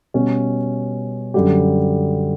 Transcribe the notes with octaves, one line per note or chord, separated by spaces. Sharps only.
B2 G3 C#4
F#2 D3 G3 D4 G4